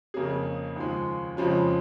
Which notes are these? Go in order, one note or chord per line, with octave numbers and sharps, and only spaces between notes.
F2 C#3 A#3 C#4 G#4
D#2 C#3 F3 G#3
F2 C#3 F3 G#3 C#4